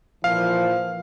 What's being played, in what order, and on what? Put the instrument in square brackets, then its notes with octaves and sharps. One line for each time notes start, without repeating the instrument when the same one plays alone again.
[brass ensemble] A#2 E3 F3 [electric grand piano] F5